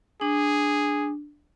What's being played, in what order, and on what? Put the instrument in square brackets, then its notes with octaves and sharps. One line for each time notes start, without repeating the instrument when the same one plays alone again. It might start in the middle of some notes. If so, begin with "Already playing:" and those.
[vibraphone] D4 [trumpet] G#4